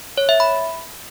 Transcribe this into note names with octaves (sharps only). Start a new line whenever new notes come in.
C#5
E5
B5